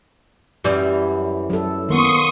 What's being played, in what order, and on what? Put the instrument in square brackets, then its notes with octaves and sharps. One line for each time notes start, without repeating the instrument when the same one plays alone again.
[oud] F#2 E3 G3
[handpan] F#3 A4
[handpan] D#3 A#3 B3 [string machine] C6 C#6 D#6